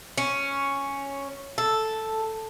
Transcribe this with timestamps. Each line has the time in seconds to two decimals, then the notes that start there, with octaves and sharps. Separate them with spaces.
0.18 C#4
1.58 A4